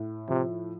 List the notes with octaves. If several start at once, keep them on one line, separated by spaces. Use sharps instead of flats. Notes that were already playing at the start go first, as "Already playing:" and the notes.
Already playing: A2
C3 F3